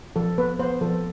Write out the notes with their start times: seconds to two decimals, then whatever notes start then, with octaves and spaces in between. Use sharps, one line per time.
0.16 F3 A4
0.38 B3 B4
0.59 B3 C5
0.81 F3 A4